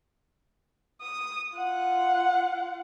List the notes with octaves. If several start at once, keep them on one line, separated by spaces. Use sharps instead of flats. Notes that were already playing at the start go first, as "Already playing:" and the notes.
D#6
F4 F#5